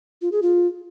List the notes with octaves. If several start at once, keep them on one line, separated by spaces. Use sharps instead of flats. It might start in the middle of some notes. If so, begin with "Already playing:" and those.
F4
G#4
F4